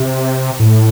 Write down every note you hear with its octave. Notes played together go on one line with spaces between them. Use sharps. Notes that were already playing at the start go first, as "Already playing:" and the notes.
Already playing: C3
A2